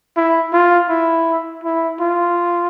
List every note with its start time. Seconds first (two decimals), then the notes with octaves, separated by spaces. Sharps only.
0.17 E4
0.53 F4
0.89 E4
1.64 E4
2.00 F4